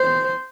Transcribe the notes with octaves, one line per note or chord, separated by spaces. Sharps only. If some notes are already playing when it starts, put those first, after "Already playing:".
Already playing: C5